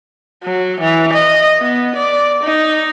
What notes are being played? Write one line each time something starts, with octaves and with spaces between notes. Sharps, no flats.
F#3
E3
D#5
B3
D5
D#4